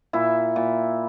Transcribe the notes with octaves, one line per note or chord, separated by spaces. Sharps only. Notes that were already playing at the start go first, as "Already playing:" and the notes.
A#2 E4
A#2